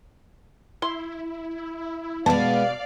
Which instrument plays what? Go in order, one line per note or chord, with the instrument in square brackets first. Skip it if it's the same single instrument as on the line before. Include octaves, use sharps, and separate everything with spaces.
[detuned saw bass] E4 [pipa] C6
[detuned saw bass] B2 [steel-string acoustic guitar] G#3 B3 [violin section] D5 F5 [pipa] A5